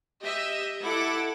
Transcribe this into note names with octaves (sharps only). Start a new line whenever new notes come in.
G4 D#5 E5
E4 A4 F#5 D6